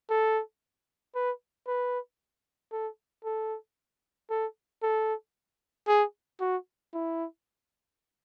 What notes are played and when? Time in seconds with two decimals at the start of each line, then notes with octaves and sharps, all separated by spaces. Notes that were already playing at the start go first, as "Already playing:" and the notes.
0.10 A4
1.15 B4
1.68 B4
2.72 A4
3.25 A4
4.30 A4
4.83 A4
5.88 G#4
6.41 F#4
6.94 E4